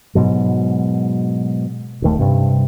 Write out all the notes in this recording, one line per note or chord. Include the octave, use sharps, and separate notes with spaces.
G#2 B2 F#3
D#1 D#2 A3
G2 C3